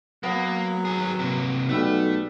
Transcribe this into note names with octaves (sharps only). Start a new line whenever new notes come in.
F#3 A#3 B3
G#4 A#4
C3 A#3
B1 G3 A3 E5 F#5